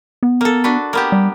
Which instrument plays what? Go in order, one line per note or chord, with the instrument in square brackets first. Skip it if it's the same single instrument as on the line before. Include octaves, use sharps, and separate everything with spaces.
[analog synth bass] B3
[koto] A#3 A4
D4 F#4 B4
A#3 B3 G4
[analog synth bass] G3